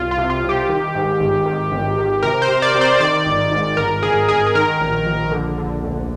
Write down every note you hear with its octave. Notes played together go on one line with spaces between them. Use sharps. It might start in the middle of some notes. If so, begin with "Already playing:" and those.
Already playing: C2 F4
F4
C3
F4
C2
G4
D#3
G#2
G#1
D#3
G#1
D#3
C3 A#4
C5
C3
D5
C3
C5
D#3 D5
G#1
G#2
G#1 A#4
G#1 G#4
G#1 G#4
G#4
D#3 A#4
A#1
A#1
D3
D3
D2